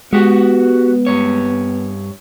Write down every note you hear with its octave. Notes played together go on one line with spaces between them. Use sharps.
G#3 B3 F#4 G4 F#5
G2 C#5